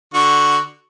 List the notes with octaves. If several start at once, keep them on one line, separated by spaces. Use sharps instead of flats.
D3 F#4 C#6